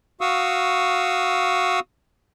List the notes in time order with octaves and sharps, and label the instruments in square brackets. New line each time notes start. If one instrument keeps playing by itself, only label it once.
[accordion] F#4 F5 C#6 D#6 E6